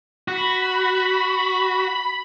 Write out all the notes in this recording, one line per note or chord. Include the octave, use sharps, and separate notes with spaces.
F#4 B5